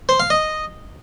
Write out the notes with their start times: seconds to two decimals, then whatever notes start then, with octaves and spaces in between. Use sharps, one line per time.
0.09 C5
0.20 F5
0.30 D#5